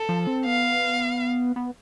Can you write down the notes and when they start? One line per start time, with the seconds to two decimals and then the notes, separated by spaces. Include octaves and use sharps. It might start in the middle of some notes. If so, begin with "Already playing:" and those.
Already playing: A4
0.09 F3
0.27 C4
0.46 B3 F5
1.56 B3